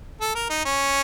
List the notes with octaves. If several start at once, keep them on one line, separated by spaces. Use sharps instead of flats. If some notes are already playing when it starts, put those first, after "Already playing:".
A4
A#4
D#4
C#4